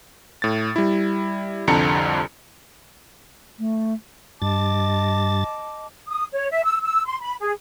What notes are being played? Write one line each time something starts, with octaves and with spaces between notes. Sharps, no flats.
A2 A6
G3 E4
C2 F2 D3 A4 A#5 C#7
A3
G2 D#5 A5 D6 A6
D#6
C#5
E5
E6
E6
C6
B5
G#4